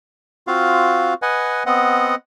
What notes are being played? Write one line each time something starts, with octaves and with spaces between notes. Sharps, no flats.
C4 F4 F#4 F5
B4 D#5 F#5 G#5
B3 C4 D#5 F#5